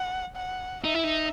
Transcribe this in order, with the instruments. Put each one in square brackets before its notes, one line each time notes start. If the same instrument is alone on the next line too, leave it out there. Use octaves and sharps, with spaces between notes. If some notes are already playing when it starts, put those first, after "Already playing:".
Already playing: [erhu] F#5
F#5
[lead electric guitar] D#4 [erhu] E5
[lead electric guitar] E4
D#4